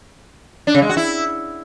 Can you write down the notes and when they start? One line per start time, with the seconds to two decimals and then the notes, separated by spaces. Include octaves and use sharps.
0.67 D4
0.75 C#3
0.82 G#3
0.89 F#4
0.97 E4